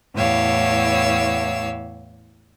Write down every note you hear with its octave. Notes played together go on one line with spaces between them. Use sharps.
E2 A2 G4 C#5 F5 E6